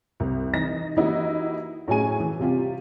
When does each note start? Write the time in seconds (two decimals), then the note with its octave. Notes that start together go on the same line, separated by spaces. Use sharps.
0.20 C2
0.54 E3 D#4 A#6
0.97 E3 A#3 D#4 E4 F#4 G4
1.88 A2 F#3 C#4 G#4 G#5 D#7
2.20 E3
2.39 C3 G3 F4 G4